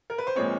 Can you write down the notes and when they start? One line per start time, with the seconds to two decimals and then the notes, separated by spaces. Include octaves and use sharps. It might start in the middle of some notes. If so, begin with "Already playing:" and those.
0.10 A#4
0.18 B4
0.27 C5
0.35 A#2 F3 G#3 C4 C#5